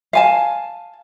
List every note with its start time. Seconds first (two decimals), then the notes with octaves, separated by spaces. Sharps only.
0.13 F5 G#5 A5